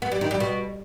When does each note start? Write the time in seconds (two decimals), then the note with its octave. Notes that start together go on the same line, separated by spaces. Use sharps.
0.02 B3
0.12 G3
0.21 D#3
0.31 G3
0.40 B2